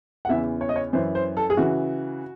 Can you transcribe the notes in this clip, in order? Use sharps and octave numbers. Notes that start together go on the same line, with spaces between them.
F#5
E2 C#3 E3 E5
C#5
D#5
C#5
F#2 E3 C5
C5
A4
G#4
C#3 E3 F#4